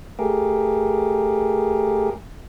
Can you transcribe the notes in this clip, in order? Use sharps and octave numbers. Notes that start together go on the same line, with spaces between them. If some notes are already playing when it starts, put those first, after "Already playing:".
A3 G4 G#4 A#4